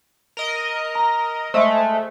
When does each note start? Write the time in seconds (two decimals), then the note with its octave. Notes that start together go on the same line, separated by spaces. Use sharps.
0.37 A#4 D#5
0.95 A#5
1.54 G#3 A3 C5 D#5 E5